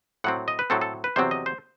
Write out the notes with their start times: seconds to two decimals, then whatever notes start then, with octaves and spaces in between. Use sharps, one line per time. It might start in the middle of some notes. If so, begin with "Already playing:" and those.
0.24 A2 F#3 C4 F#5
0.48 D#5
0.59 B4
0.70 A2 F#3 C4 A4
0.81 A4
1.04 B4
1.16 E2 C3 F#3 C4 C5
1.31 D#5
1.46 C5